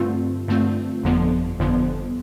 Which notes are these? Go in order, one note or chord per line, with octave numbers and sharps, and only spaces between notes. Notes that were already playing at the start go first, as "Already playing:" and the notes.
Already playing: G2 D3 A3 C4 F4
G2 D3 A3 C4 F4
G1 F2 D3 F3 B3
G1 F2 D3 F3 B3